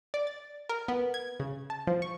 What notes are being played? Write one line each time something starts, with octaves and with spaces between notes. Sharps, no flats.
D5
A6
A#4
B3
G#6
C#3
A5
F3
C#6